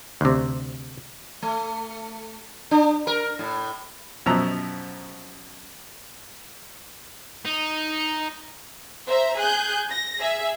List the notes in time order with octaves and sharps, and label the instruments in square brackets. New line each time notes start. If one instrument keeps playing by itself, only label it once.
[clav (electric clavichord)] D2 C3
[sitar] A3
D4
A#4
A2
[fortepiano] F#2 B2 F3 A#5 E6
[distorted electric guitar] D#4
[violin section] C5 E5 A#5
G#4 F#6 G6
A#6
G#4 E5